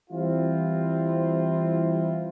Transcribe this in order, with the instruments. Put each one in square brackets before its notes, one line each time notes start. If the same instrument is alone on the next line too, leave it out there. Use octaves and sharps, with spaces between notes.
[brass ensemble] E3 G3 C4 E4 F4